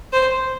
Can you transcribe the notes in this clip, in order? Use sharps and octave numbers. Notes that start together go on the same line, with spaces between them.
C5